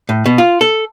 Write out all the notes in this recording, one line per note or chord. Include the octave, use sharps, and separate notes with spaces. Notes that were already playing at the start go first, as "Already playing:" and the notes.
A2
B2
F4
A4